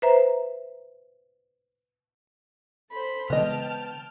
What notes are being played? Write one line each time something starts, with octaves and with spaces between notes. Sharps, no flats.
B4 C5 E5 A#5
A4 C5 B5
C#3 E3 G#3 B3 D#5 G5 A5 F6